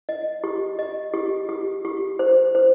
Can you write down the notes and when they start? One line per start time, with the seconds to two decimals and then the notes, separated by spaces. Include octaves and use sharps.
0.09 D#5
0.44 G4
0.79 D#5
1.14 G4
1.49 G4
1.85 G4
2.19 C5
2.55 C5